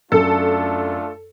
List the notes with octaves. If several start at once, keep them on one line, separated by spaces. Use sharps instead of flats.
F#2 A3 D4 F4 A4